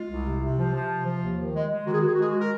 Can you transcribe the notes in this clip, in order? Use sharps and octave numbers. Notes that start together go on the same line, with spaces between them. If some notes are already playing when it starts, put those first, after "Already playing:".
Already playing: G#3 F4
C2
C3
C3
F3 F4
F3
C3
F3
D#2
D#3
G#3
G#3
D#3 F#4
G#4
D#3 F#4
G#4
F#4
G#3 G#4
F#4
A#4